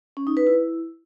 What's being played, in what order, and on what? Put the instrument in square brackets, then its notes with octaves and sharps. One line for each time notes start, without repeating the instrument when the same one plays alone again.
[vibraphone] C#4
D#4
B4
E4